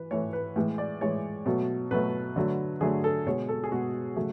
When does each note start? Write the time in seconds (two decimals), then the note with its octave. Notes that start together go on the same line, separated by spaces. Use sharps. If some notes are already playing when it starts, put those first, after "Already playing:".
Already playing: E3 B4
0.11 A2 E3 A3 C#5
0.33 B4
0.56 A2 E3 G#3
0.78 D5
1.01 A2 E3 G#3 C#5
1.46 B2 F#3 A3
1.91 B2 F#3 A3 B4
2.36 D3 F#3 A3
2.81 D3 F#3 A3 G#4
3.04 A4
3.26 B2 G#3 C#5
3.49 A4
3.64 G#4
3.72 B2 G#3 F#4
4.16 C#3 F#3 A3